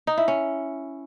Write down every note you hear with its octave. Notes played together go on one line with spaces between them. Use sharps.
D#4
E4
C#4